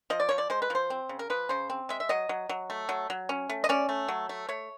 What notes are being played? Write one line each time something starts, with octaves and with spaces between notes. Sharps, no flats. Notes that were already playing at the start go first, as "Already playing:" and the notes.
F3 D#5
D5
F3 C#5
D5
G#3 C5
B4
F3 C5
C4
C#3
A#4
F3 B4
C#3 C5
C4
G#3 E5
E5
F#3 D#5
F#3
F#3
A3
F#3
F#3
C#4
A3
D#5
C#4 D5
A3
F#3
A3
A3 C#5